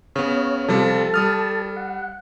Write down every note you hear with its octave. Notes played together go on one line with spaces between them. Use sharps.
C#3 B3 C#5
C3 F3 G3 A4 A5
G3 D#6 F6
F#5